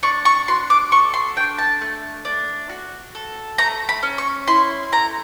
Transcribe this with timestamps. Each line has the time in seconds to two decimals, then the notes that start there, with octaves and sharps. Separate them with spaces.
0.03 D4 C#6
0.25 C#6
0.48 F#4 C6
0.70 D6
0.91 A4 C#6
1.14 C6
1.36 D4 G5
1.58 A5
1.81 A3
2.25 D4
2.69 F#4
3.15 A4
3.58 A3 A#5
3.89 B5
4.03 C#4
4.18 C#6
4.47 E4 C6
4.92 A3 A#5